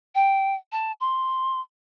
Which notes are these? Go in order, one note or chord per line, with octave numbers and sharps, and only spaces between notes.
G5
A5
C6